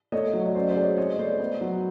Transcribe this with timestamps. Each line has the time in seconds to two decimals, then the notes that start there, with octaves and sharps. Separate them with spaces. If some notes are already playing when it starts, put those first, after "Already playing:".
0.12 A3 C#5 D#5
0.33 F#3
0.45 D#5
0.55 C#4 C5 D5
0.69 C5 D5
0.76 G#3
0.83 C#5 D#5
0.97 C4 C#5 D#5
1.18 A3 C5 D5
1.40 B3
1.61 F#3